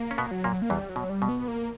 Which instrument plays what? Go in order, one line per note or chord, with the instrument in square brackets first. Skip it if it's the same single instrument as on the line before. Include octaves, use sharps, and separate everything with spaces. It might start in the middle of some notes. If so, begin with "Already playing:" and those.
Already playing: [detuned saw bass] A#3
[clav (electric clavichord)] C#4
B2 B3
[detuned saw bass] F#3
[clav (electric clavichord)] A#2 A#3
[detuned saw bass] A#3
[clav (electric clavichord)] E2 E3 [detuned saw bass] G3
[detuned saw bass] F#3
[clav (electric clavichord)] B2
[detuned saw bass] G3
[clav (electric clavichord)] B2
[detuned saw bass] B3
A#3